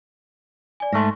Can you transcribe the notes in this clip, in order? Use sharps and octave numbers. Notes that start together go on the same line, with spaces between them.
D5 G#5
G#2 A3 C6 C#6 A#6